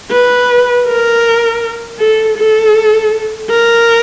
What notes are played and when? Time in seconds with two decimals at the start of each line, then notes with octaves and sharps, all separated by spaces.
0.12 B4
0.87 A#4
2.00 A4
2.37 A4
3.50 A#4